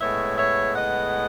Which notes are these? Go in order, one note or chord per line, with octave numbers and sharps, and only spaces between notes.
A2 G#3 B3 C#5 E5
C#5 E5
D#5 F#5